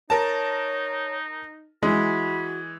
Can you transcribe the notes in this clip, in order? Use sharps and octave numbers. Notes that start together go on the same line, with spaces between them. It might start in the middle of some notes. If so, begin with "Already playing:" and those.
D#4 A#4 C#5 A5
E3 G#3 F#4 B5